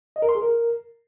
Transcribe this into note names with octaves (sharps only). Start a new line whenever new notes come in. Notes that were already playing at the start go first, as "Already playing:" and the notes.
D#5
A#4
C6
G#4
A#4